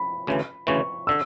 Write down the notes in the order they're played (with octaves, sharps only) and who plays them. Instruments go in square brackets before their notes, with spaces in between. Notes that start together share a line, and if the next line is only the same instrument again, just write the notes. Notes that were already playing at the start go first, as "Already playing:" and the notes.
Already playing: [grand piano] B5
[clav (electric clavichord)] D2 C#3 E3
[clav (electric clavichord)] D2 C#3 E3 [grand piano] C#6
[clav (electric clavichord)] D3 [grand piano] E6